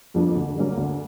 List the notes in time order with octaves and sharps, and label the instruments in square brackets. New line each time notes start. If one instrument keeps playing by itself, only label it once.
[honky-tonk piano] F2 F3 A#3 D4
D2
D3 F#3 A#3
D2